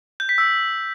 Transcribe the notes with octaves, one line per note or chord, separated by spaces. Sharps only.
G6
B6
E6